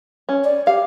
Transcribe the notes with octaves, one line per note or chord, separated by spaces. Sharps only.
C#4
D5
G4 F5